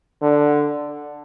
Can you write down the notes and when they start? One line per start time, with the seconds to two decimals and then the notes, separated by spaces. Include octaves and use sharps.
0.22 D3